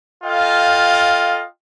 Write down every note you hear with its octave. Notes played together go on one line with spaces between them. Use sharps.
F4 A4 D#5 F5 G5